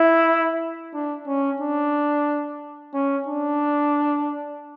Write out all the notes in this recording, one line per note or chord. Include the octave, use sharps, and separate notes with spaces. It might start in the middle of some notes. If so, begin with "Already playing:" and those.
Already playing: E4
D4
C#4
D4
C#4
D4